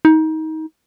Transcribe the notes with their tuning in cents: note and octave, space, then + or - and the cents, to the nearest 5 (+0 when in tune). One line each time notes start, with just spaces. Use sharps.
D#4 +25